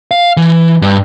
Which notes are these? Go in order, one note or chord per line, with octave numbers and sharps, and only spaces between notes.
F5
E3
G2